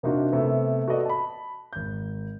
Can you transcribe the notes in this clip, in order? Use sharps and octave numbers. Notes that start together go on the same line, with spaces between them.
C3 A#3 D4 D#4 F4 F#4
C3 A3 B3
F#4 A4 B4 D5 D#5
A5 B5
G#1 G6